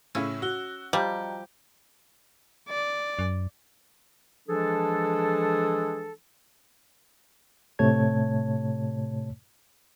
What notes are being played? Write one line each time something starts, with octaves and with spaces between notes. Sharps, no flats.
A2 C#3 C#4 E4 E6
F#4 E6 F#6 G7
F3 G3 G4 D#5 G5 A#5
D5
F#2
E3 F3 G#3 D4 G#4 A4
A2 C3 A3 C#5 A5 G#6